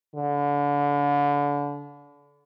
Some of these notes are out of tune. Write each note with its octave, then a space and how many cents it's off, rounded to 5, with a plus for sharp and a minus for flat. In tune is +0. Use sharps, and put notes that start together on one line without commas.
D3 -30